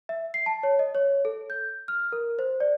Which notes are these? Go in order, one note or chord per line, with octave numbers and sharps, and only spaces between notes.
E5
C7
A5
C#5
D#5
C#5
A4
G6
F6
A#4
C5
D5